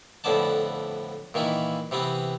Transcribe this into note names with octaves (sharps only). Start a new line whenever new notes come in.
F2 A2 D3 B3 D5 A5
A#2 D#3 E3 E4
C3 E3 B3 C4